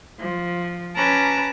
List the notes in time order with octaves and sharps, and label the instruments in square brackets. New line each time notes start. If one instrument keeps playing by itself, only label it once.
[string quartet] F3
C#4 B4 A5 A#5 D6